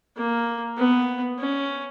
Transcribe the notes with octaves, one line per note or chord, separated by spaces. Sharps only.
A#3
B3
C#4